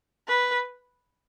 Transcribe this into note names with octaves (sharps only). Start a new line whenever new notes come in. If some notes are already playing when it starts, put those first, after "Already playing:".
B4